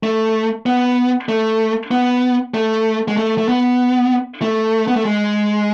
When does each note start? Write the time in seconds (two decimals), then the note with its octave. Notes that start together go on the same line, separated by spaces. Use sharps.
0.03 A3
0.66 B3
1.29 A3
1.91 B3
2.54 A3
3.08 G#3
3.17 A3
3.38 A3
3.49 B3
4.42 A3
4.87 B3
4.96 A3
5.05 G#3